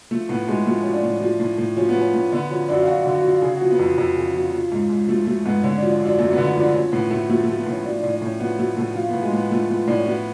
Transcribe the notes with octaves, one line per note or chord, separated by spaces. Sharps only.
F3 A3
A2 B3
A2 G#3
F3 A3
F3 C#4
D4
A2
F3
A2
A2
F3 C#4
B3
F3
C#4
A2
D3 B3
F3 C#4
F#2 D4
F4
F#2 F#4
F#4
D3
F#4
F3 F4
C#3 G#4
F#4
F3
B3
F2
F2
C#3
F3
F3
G#2
G#2
F3 A3
F3 A3
G#2 B3
D3 C#4
D4
F3
D4
F#2
D4
F#2 A3
B3
D3
D4
F3 D4
F3 C#4
A2 B3
A2 A3
F3 A3
A3
F3
B3
A2 C#4
F3 D4
D4
A2
D4
A2 C#4
F3 B3
F3 A3
A2 A3
F3 F4
B3
A2
G#3
A2 B3
F3 A3
F3 B3
A2 D4
C#4
F3 B3